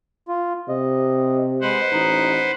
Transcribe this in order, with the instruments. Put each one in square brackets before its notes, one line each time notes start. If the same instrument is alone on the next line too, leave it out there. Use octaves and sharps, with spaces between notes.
[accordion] F4
[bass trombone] C3 [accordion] D#5
[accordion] G#3 [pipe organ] B4 C5 F#5
[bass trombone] A1 [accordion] D#4